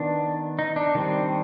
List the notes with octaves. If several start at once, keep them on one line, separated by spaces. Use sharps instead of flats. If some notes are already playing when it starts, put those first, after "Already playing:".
Already playing: D#3 B3 D4
D#4
D4
D#3 G3 C4